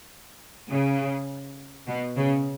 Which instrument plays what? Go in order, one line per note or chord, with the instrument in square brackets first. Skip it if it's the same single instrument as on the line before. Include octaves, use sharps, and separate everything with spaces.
[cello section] C#3
B2
C#3